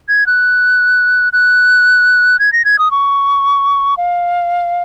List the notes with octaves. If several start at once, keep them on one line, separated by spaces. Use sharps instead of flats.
G#6
F#6
F#6
G#6
A#6
G#6
D#6
C#6
F5